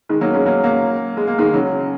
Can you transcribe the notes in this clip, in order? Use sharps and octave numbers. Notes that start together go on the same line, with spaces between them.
D#3 G#3
F#3 A#3
G#3 C#4
F#3 A#3
F#3 A#3
G#3
A#3
D#3 G#3
C#3 F#3